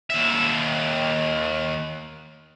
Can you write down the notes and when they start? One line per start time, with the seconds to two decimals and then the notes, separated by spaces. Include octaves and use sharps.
0.10 D#2 E5